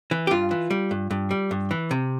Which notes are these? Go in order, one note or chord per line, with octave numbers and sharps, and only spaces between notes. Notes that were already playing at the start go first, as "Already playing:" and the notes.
E3
G4
G2 F4
E3
G3
G2
G2
G3
G2
E3
C3